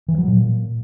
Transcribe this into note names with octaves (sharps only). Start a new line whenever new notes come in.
E3
F#3
A#2